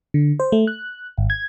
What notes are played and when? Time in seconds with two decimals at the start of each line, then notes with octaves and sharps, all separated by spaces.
0.14 D3
0.40 C5
0.52 A3
0.67 F#6
1.18 G#1
1.30 G#6